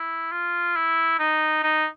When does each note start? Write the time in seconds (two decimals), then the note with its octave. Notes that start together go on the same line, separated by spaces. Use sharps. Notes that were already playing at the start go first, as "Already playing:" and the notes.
Already playing: E4
0.32 F4
0.76 E4
1.19 D#4
1.63 D#4